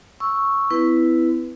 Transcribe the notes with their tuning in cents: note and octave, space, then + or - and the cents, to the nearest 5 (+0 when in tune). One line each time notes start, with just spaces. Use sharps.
C#6 +0 E6 +0
C4 -45 E4 +0 B4 +0